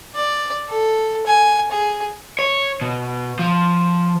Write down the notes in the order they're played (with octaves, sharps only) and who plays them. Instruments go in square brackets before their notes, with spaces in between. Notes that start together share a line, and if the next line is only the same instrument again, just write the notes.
[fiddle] D5
A4
G#5
G#4
[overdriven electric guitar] C#5
B2
F3